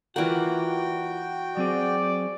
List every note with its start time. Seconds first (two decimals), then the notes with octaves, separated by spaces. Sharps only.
0.16 E3 A#3 F4 F#4 D5 F#5 G5
1.57 F#3 C4 G#4 D5